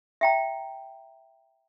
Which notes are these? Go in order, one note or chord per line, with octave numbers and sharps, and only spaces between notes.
E5 G5 A#5